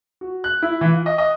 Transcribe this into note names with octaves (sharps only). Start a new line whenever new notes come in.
F#4
F#6
E4
E3
F4
D#5
D#5